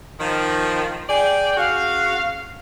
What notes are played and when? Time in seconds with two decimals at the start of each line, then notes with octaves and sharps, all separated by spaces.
0.20 D#3 F3
1.09 G#4 D5 G5
1.57 C#3 F#4 F5